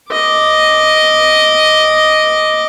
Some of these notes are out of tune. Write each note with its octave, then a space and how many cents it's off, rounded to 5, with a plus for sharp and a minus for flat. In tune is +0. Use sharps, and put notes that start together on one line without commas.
D#5 +0 D6 +0